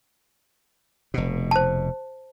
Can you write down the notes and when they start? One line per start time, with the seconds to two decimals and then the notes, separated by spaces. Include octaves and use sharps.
1.14 F1 B2
1.51 C5 A5